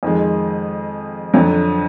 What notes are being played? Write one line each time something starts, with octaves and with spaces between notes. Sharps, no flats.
F2 D#3 G#3
F2 D3 F#3